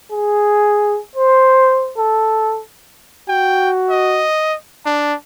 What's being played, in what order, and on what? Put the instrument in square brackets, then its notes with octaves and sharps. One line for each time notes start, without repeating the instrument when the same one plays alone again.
[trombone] G#4
C5
A4
[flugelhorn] F#4 [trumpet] G5
[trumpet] D#5
[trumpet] D4 [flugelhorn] A5